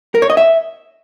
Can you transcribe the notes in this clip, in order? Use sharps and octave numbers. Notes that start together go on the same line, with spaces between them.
A#4
C#5
D#5
E5